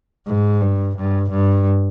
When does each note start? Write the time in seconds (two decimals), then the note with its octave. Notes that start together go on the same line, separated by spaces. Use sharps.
0.27 G#2
0.61 G2
0.97 G2
1.30 G2